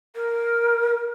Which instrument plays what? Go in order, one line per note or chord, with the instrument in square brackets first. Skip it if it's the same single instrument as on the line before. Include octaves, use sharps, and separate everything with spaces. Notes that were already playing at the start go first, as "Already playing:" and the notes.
[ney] A#4